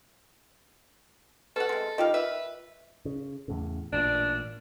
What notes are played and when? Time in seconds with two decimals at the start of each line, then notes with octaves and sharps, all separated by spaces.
1.56 B2 A4 B4 F#5
1.69 C3 G#3
1.98 D#3 F4 G4 A#4 D#5 F5
2.14 B4 E5
3.05 C#3
3.48 E2 A2 C#3
3.93 A1 A#2 D4